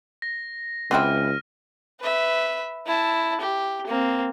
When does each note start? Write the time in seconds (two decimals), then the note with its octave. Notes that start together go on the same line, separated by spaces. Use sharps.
0.22 A#6
0.91 C#2 E3 C4 E4 F#5 G5 F6 D#7
2.00 B4 E5
2.86 E4 A5
3.41 G4
3.87 A#3 C4